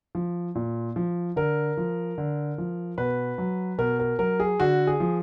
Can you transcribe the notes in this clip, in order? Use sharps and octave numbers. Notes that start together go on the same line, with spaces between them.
F3
A#2
F3
D3 A#4
F3
D3
F3
B2 B4
F#3
B2 A#4
A#4
F#3 A#4
G#4
D3 F#4
G#4
F3